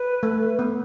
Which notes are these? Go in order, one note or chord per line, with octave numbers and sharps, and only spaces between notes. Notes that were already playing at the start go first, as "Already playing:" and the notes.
Already playing: B4
A3
B3